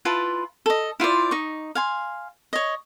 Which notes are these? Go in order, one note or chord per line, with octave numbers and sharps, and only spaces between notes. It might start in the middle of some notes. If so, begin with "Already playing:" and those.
E4 F4 B4 A5
A4 D#5
E4 F4 C5 D5
D#4 C#6
F5 G#5 C6
C#5 D#5